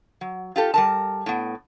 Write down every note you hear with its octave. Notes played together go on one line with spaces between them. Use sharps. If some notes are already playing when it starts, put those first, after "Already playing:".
F#3
F4 G4 A4
G3 A#4 A5
A2 B3